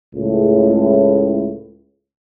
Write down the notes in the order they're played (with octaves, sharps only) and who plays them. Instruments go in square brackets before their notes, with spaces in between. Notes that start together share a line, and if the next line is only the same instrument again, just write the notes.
[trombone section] C#2 A2